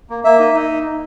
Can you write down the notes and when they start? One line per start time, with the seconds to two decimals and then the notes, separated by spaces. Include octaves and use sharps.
0.10 A#3
0.24 A#3 E5
0.39 D#4
0.54 D#4